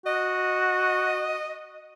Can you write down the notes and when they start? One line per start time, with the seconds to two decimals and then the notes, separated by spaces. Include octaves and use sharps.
0.06 F#4 D#5